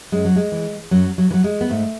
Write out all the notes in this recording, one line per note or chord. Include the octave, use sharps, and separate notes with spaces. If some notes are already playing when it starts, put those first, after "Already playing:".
F#2 G#3
F#3
G#3
E3
F#2 F#3
F#3
E3
F#3
G#3
B3
G#2 A3